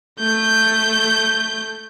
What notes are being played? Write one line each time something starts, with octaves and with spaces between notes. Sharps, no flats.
A3 G6